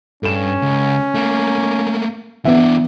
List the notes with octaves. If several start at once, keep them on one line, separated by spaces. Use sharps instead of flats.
G2 C#4 A4 E7
C#2
A3 A#3
E3 B3 D4 E5